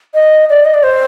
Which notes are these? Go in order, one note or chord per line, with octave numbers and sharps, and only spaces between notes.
D#5
D5
D#5
D5
C5